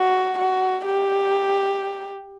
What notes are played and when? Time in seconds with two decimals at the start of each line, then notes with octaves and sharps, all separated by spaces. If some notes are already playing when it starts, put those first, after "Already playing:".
Already playing: F#4
0.39 F#4
0.85 G4